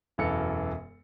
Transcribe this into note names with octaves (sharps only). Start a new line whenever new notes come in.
E1 F#2 E3 A4 F5 C#7